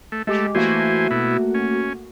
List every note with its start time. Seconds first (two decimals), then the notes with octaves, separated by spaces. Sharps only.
0.12 A3
0.27 G#3 A3 G4
0.55 E3 A3 A#3 F#4 C5 G#5
1.11 B2 E4
1.54 C#4